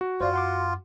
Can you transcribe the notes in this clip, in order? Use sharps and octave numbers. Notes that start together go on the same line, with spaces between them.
F#4
F#2 F4 C5 D5 F5
F#5 C6 D6